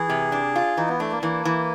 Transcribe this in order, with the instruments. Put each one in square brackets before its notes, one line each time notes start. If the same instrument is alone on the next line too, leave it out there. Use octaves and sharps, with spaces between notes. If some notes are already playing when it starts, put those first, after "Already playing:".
Already playing: [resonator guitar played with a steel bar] E3 [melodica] G#4
[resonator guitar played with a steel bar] C3
D4
F4
[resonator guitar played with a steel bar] E3 [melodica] D#4
[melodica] B3
[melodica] A3 [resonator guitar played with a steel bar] D4
[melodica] A#3
[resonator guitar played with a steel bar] E3 [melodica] A#3
[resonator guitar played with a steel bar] E3